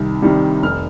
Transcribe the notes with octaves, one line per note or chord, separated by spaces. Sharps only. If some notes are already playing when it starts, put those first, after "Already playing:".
Already playing: C2 C3 D#3 G3
C3 D#3 G3
F1 F6